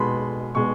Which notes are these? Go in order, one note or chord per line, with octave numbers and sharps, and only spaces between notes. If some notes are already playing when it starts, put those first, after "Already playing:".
Already playing: B2 G#3 B3 B5 C6
B2 G#3 B3 C#6